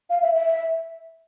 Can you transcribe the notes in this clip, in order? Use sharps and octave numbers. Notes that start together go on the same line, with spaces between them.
F5
E5
E5